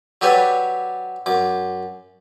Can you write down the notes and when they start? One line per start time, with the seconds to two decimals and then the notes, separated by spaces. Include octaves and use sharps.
0.21 F#3 D4 G4 A4 B4 C#5
1.26 F#2 D6